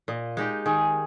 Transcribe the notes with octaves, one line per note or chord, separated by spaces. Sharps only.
A#2 D#5
G#3 D#4 G4
D#3 G#4